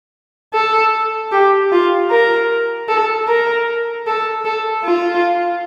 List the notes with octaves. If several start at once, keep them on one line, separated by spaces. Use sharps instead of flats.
A4
G4
F4
A#4
A4
A#4
A4
A4
F4